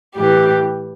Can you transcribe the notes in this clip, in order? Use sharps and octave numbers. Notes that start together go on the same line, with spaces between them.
A2 E3 G3 G4